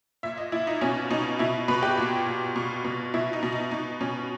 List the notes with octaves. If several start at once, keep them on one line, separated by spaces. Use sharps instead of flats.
A#2 E5
D#5
A#2 E4
D#4
B2 C#4
B2 D#4
B2 E4
B2 B4
G4
A#2
A#2
B2
B2
B2 E4
D#4
B2
D#4
B2 D#4
B2 C#4